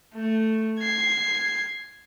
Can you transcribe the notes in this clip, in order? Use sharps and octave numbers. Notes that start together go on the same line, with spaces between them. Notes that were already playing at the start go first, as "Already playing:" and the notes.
A3
G#6 C7